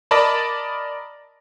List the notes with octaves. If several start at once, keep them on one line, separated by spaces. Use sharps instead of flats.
A#4 D5 D#5 A5 B5